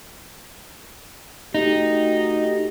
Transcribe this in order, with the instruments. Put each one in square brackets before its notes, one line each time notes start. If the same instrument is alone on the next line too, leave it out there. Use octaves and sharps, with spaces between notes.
[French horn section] A3 F#4 G4 [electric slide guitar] D#4